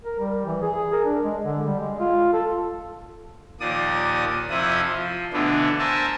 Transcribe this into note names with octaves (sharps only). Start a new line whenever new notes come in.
A#4
G3
E3
G#4
A#4
D4
G#3
D3
G3
G#3
F4
A4
D#2 A#2 F3 D5 D#6
F2 C3 F3 E4 F4 D#6
F3
B2 D3 E3 A3 B3 D4
A#4 C5 E5 G#5 A5